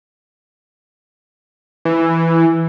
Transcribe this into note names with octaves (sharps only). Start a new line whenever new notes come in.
E3